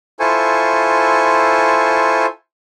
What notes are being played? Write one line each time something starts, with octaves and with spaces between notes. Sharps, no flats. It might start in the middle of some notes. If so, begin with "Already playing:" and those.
E4 F4 A4 C5 G#5 C#6